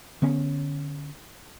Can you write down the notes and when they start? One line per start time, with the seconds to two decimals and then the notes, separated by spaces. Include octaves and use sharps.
0.22 D3 B3 C#4